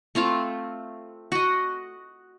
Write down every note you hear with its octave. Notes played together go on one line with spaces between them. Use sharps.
A3 C4 F4 F5
F#4 D#5